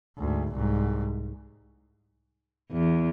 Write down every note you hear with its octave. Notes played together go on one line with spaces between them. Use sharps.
D2 G#2
C2 G#2
E2